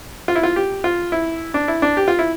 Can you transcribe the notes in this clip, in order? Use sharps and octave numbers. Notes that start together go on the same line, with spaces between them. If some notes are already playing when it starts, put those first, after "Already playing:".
F4
E4
F4
G4
F4
E4
D4
E4
D4
G4
F4
E4